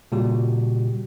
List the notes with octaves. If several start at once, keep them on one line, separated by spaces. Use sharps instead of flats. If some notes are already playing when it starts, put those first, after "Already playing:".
A#2 C#3 G3 F#4 G4